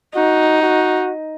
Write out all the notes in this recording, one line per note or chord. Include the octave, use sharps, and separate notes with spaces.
D#4 F#4
F#4